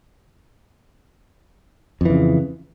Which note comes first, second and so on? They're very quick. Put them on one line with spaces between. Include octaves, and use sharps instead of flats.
F2 E3 C#3